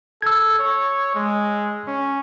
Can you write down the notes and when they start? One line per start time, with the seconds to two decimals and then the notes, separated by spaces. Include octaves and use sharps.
0.22 A4 E6 G#6
0.59 C#5
1.15 G#3
1.88 C#4